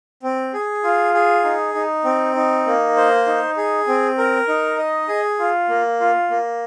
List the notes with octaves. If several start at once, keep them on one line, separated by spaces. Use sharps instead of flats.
C4
G#4
F4
G#4
D#4
D#4
C4
D#4
A#3
C5
D#4
G#4
C4
A#4
D#4
D#5
G#4
F4
A#3
F4
A#3